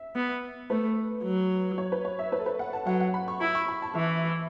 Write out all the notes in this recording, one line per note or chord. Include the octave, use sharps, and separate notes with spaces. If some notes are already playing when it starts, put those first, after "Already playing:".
Already playing: E5
B3
A3 B4
F#3
C#5
B4
C#5
E5
B4
A4
B4
F#5
A5
F#3 F#5
F#5
B5
C#6
E4 B5
C#6
B5
A5
E3 E5